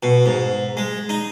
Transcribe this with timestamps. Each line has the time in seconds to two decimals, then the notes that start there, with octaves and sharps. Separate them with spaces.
0.03 B2
0.26 G#2
0.77 G#3
1.09 D#4